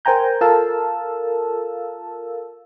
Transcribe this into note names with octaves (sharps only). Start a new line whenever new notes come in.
A#4 C5 G5 G#5 A#5 G6
F4 A4 A#4 F5 A5 E6